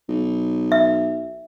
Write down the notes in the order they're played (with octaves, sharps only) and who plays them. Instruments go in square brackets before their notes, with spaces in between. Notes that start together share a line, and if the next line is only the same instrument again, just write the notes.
[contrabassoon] B1
[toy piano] E5